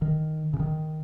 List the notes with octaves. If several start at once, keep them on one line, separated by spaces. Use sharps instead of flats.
D#3
C#3
D#3